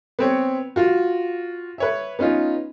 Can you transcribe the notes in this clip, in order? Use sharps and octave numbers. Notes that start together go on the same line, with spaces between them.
B3 C4 C#5
F4 F#4
B4 C#5 E5
B3 C#4 D#4 F4